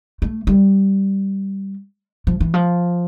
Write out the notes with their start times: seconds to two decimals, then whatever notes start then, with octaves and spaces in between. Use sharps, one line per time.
0.22 A3
0.47 G3
2.27 F3
2.40 E3
2.54 F3